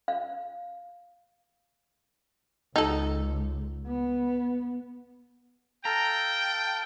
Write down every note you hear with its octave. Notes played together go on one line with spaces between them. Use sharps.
F5
C#2 D#4 A4
B3
A4 F5 G5 A5 A#5